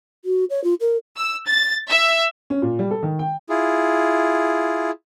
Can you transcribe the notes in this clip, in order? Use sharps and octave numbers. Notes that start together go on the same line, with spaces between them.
F#4
C#5
F4
A#4
E6
A6
E5
C#4
A#2
G3
A4
D#3
G5
E4 F4 G#4